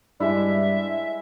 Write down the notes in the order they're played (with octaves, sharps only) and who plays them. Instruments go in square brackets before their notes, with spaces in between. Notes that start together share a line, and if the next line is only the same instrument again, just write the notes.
[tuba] G2 [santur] G#3 E4 [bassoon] D4 [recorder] E5